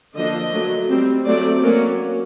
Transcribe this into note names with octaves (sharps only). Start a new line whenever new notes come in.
D3 F3 A#3 D4 D#5
D3 F#3 A3
G3 C4
F#3 A3 C4 D5
F#3 A#3 C#4